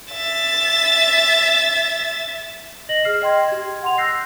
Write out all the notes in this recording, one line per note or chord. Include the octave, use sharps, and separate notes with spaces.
E5 A6
D#5 A#6 F#7
G#4 F6 C7 E7
D#5 G5 C6 G#6
G4 G#6
F#5 C6 F7
E6 F#6 G6 A#6 C7